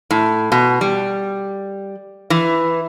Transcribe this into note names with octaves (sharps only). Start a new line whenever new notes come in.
A2
B2
G3
E3